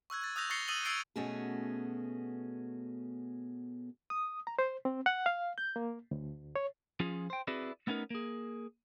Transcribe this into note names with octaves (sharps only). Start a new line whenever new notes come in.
C#6 E6 F#6 G#6
F#6 A6
D#6 E6 F#6 G6 A#6 F7
C#6 A6 A#6 C7 C#7 G7
D#6 E6 A6 D#7 F#7 G7
E6 G#6 A6 C7 D7 G7
B2 A3 B3 C#4 F#4 G#4
D#6
A#5
C5
C4
F#5
F5
G6
A#3
D2
C#5
F3 C#4 F4 G#4
C5 G5
C4 E4 F#4 G#4 B4 D5
A3 B3 C#4 D#4 A#4
A#3 G#4